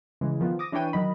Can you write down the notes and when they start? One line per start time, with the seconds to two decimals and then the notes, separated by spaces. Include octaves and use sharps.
0.21 C#3 E3 G#3
0.40 D#3 F3 B3 F4
0.59 D6 D#6 A#6
0.72 E3 D4 B4 C#5 G5 D#7
0.93 D#3 F#3 D#5 B5